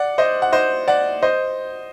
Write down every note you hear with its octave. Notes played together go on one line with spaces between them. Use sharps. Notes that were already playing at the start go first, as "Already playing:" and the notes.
Already playing: D5 F#5
C5 D#5
F#5
C5 D#5
D5 F#5
C5 D#5